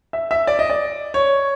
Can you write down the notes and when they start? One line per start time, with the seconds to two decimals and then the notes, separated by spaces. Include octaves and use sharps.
0.13 E5
0.31 E5
0.47 D5
0.59 D#5
0.70 D5
1.14 C#5